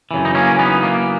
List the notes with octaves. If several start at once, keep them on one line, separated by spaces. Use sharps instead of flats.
F#2 C#3 E3
D#4
A#3 C#4
B3 D#4
A#3